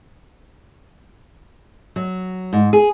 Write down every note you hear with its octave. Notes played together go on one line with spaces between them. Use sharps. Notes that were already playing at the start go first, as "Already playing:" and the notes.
F#3
G#2
G#4